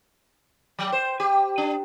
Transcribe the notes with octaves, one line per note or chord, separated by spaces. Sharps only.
F#3
C5
G4
D4